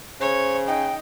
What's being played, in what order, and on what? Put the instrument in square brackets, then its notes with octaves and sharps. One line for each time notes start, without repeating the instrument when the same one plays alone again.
[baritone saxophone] C#3 [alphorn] C5 [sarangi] C#5
[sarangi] D#4 [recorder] G5